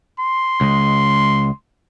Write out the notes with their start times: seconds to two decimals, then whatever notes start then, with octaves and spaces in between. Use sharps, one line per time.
0.20 C6
0.61 C#2 G#3